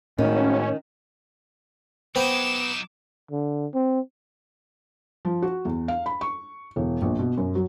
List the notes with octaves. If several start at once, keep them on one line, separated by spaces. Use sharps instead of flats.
G#1 A2 D#3 C#4
F#3 B3 D#4 C5 G5 D6 E7
D3
C4
F3
F#4
E2
F5
B5
C#6
E1
A#1
B2
F#2
F#3